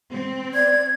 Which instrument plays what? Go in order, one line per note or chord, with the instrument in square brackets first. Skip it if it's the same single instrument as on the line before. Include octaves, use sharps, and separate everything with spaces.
[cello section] C4
[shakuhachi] D5 [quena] G#6